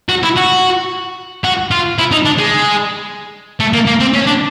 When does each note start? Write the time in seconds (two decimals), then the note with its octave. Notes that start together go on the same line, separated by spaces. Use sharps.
0.09 F#4
0.23 E4
0.36 F#4
1.44 F#4
1.71 F4
1.99 E4
2.12 D#4
2.25 D4
2.38 G#3
3.60 A3
3.73 A#3
3.87 A#3
4.00 C4
4.14 C#4
4.27 D4